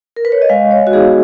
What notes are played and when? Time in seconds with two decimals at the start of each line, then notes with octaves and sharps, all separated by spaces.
0.16 A#4
0.25 B4
0.32 C#5
0.42 D#5
0.49 G#3 F5
0.71 C#5
0.87 F#4
0.93 B3 D#4 G#4